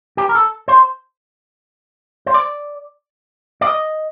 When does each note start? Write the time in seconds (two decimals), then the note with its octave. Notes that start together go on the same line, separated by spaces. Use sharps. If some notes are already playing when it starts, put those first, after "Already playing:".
0.17 G4
0.29 A#4
0.35 A4
0.68 C5
2.26 C5
2.34 D5
3.61 D5
3.67 D#5